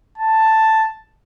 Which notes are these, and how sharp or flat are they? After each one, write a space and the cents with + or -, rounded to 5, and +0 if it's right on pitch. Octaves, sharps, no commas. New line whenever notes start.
A5 +5